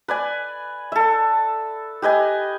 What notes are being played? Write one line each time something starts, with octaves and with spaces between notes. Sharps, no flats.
B4 D5 G#5
A4 E5
G4 B4 D#5 G#5